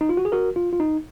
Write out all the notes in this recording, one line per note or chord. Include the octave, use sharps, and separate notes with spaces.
D#4
F4
F#4
G#4
F#4 A#4
F4
F4
D#4